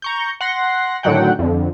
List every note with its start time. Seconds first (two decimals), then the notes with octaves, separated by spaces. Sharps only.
0.02 A#5 C#6 G6
0.41 F#5 C6 A#6
1.03 A2 D3 D#3 F#3 F#5 G5
1.39 F2 D3